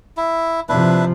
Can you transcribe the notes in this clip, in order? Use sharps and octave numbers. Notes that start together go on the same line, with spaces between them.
E4
C3 F3 D4 E4 B4